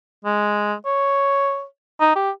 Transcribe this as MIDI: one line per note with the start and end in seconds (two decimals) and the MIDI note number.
0.25 0.74 56
0.86 1.64 73
2.00 2.11 63
2.16 2.31 67